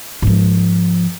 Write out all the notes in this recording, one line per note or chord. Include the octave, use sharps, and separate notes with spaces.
G#2 F3